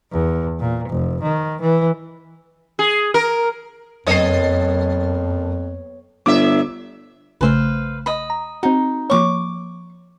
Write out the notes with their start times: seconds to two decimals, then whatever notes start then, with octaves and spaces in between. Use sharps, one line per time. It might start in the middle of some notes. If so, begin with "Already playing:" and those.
0.12 E2
0.60 A#2
0.90 F1
1.22 D#3
1.61 E3
2.79 G#4
3.14 A#4
4.07 F#1 F2 B3 C#5 D#5 C7
6.26 G1 A2 E5 D6
7.41 A#1 C#3 A3 B4 C5 F5
8.06 D#5 B5
8.30 A#5
8.63 C4 D#4 F#4
9.10 F3 A#3 C#5 C#6 D6